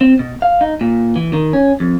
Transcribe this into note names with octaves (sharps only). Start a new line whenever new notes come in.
C4
B2
F5
D#4
A#2
E3
D#3
C#4
F2